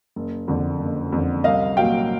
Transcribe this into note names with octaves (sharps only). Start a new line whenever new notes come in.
F#1
F2 D3
F#1
F2 D3
C2 D#5 F5
A#2 F#3 F5 G5